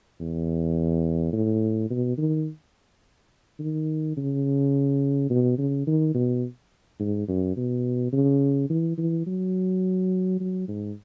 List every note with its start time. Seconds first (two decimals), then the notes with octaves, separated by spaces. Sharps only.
0.20 E2
1.33 A2
1.90 B2
2.18 D#3
3.59 D#3
4.17 C#3
5.30 B2
5.58 C#3
5.87 D#3
6.14 B2
7.00 G#2
7.28 F#2
7.56 B2
8.13 C#3
8.70 E3
8.98 E3
9.26 F#3
10.40 F#3
10.68 G#2